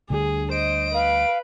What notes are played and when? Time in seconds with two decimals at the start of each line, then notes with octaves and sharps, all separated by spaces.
0.10 D2 D3 G3 G#4
0.51 C5 D#5 D7
0.94 B4 F5